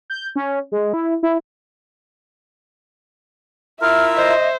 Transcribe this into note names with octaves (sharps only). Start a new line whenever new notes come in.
G6
C#4
G#3
E4
E4
E4 F4 A#4 E5 F6
C5 D#5